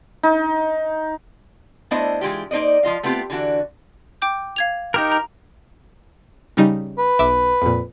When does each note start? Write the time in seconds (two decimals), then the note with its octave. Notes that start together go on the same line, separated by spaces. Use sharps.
0.23 D#4
1.91 A3 B3 D4 E4 C5 D#5
2.21 E3 G#3 F4 G4
2.51 A#3 D#4 C5 D5 D#5
2.83 F3 F4 D#5 F5
3.03 A3 B3 C4 F4 G4
3.30 D3 E3 D4 F#4
4.22 G5 D6 G6
4.56 F5 G#6 F7
4.94 D#4 G4 A#4
5.12 A#5
6.57 C#3 G3 D#4
6.98 B4
7.19 B1 E5 D6
7.62 F2 A#2